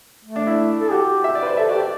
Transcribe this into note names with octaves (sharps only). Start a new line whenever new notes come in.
A3
D4
E4
A4
F#4 G4
E5
D5
B4
C5
A4 E5
F#4 D5
G4
D5